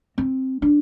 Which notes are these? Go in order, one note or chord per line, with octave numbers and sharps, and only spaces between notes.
C4
D4